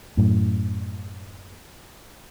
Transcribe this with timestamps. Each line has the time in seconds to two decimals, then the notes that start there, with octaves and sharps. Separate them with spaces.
0.17 F#2 A2